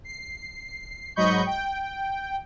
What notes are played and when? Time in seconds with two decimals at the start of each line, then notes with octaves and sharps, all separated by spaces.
0.04 C7
1.16 G#2 F#3 D#5 B5 C#6 G6
1.46 G5